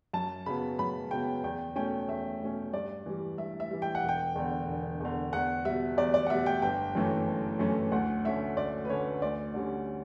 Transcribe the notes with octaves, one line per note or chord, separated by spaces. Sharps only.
F#2 A5
C#3 F#3 B3 B5
F#2 B5
C#3 F#3 B3 G5
E2 G5
B2 A3 C#4 G5
E2 E5
B2 A3 C#4
G2 D5
E3 G3
G2 E5
E5
E3 G3
G5
F#5
E1
G5
E2 D3
E1
E2 D3
E2 F#5
B2 G3 E5
E2 D5
D5
F#5
B2 G3 E5
G5
G1 G5
F#2 E3 A3 C#4
G1
F#2 E3 A3 C#4
D2 F#5
D3 A3 C#4 E5
D2 D5
B4
D3 A3 C#4 C#5
D2 D5
D3 G3 C#4